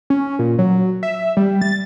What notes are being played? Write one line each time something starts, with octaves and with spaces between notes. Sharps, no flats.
C#4
A#2
F#3
E5
G3
A6